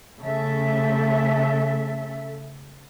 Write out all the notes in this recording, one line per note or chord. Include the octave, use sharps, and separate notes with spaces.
C#3 A3 A4 E5